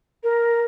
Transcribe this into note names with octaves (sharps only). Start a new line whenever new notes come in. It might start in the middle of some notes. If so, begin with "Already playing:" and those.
A#4